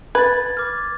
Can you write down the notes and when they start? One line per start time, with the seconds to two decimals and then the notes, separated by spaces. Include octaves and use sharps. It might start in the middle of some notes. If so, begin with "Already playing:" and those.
0.15 B4 G#6 A6
0.57 D6 F6